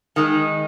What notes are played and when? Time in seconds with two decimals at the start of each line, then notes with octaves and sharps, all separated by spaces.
0.16 D#3 G#3 D#4